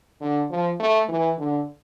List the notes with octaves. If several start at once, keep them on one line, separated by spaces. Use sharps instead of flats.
D3
F3
A3
E3
D3